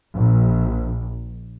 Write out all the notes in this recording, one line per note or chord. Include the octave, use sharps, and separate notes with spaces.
A#1